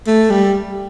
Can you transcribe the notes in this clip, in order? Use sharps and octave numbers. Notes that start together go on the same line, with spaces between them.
A3
G3